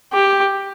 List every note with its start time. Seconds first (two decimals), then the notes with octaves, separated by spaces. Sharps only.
0.13 G4